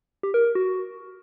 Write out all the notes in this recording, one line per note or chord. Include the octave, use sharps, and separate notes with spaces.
G4
A#4
A#4
F#4